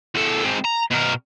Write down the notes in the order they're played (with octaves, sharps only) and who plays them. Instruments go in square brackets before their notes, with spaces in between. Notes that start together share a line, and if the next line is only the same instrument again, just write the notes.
[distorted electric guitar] E2 A4
G#3 C4
A#5
B2 A#4